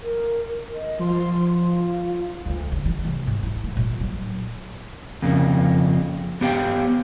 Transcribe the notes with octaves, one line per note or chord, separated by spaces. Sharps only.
A#4
D#5
F3 C6
F4
D2
C#3
E3
C3
G#2
E4
A#3
A#2
F#3
F2 C#3 A#3
B3 G4 F5 G5